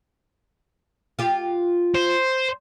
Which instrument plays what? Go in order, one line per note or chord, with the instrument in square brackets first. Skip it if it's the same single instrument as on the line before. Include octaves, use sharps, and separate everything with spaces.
[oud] F4 G4
[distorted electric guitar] C5